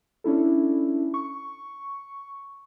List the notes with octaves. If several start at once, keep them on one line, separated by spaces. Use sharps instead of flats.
C#4 D4 E4 A4
C#6